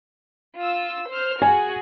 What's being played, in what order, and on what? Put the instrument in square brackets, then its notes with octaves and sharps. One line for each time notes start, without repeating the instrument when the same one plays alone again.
[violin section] F4 E6
C5 F6
[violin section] F#4 G#4 [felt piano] G#5